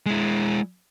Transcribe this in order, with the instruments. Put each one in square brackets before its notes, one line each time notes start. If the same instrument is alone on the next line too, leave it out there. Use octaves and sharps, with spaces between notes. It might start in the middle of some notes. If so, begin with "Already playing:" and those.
[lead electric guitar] G#3 E4